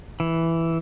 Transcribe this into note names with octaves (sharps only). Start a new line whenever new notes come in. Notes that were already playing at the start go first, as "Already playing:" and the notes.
E3